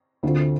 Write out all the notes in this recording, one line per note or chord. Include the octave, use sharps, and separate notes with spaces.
D2 D3 A3 C4 F4